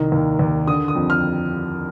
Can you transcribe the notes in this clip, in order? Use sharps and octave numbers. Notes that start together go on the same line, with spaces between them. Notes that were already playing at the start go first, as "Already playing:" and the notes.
Already playing: C2 D#3
D#2
D#2
D3 D#6
D#6
F2
F6